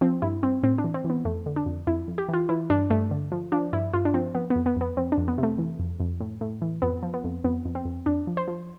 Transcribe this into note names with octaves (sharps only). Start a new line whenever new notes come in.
F3 C4
G2 E4
G2 C4
A2 C4
D4
E3
C4
E3
B3
F2 A3
D3
D4
F2
F2 E4
F2
G4
E3 F4
E3 E4
G2 D4
G2 A3
D3
F3
F3 D4
G2 E4
G2 F4
D4
F3 C4
F3 B3
B3
F2
B3
F2 B3
F2 C4
D4
F2
B3
C3
A3
E3
F2
F2
A2
A2
E3
F2 B3
F3
B3
F2
F2 B3
F2
C4
F2
F2 D4
F3
C5
F3